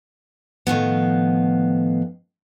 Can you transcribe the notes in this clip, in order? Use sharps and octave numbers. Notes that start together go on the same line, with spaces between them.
A2 D#3 F3 B3